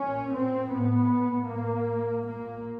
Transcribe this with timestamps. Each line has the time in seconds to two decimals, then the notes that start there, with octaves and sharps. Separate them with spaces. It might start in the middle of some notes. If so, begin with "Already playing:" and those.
Already playing: A#2 C#4
0.32 C4
0.70 A2 B3
1.47 A2 A#3
2.26 A#2 A#3